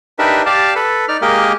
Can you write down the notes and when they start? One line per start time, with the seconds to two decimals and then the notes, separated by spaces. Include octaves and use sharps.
0.19 D4 D#4 G4 A#4 B4 E5
0.46 G4 D5 F5 A5
0.75 A4 B4
1.08 D#4 D5 F6
1.22 G#3 A#3 G4 A#4 D#5